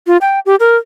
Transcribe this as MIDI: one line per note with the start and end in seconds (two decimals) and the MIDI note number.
0.07 0.17 65
0.21 0.40 79
0.46 0.55 67
0.60 0.77 70